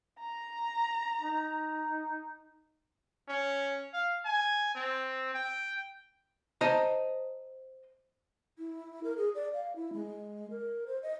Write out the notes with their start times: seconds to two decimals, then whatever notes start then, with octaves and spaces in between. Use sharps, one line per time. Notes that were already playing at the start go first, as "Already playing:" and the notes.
0.19 A#5
1.21 D#4
3.29 C#4
3.94 F5
4.25 G#5
4.75 C4
5.34 G5
6.61 C5 D#5 A5 A#5
8.57 E4
9.04 A#4
9.17 G#4
9.35 D5
9.54 F5
9.76 E4
9.93 G#3
10.50 A#4
10.87 C5
11.03 D#5